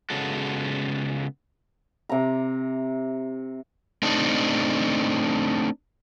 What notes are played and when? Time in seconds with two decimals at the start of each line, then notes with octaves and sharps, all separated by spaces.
0.10 C#3 G#3 B3 F#4 A4
2.09 C3 A#5
4.03 A3 C4 D4 D#4